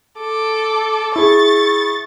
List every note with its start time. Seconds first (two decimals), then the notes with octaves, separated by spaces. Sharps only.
0.18 A4 D6
1.16 E4 G#4 C#6 A6